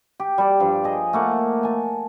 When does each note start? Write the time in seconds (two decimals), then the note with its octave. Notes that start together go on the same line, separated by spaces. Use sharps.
0.20 G4
0.38 G3 D5
0.60 G2 F3
0.84 G#4 D#5
1.13 A3 A#3 F#5
1.63 G#5 A5